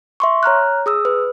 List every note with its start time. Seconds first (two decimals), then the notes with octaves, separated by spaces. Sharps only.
0.20 E5 C6 C#6
0.43 C#5 A#5 F6 F#6
0.86 G#4 D#6 E6
1.05 B4